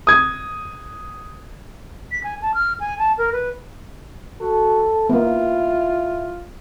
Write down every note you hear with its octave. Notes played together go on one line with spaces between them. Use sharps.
D#6 G#6
B6
G#5
A5
F6
G#5
A5
A#4
B4
F#4 A4
A#3 B3 E4 F4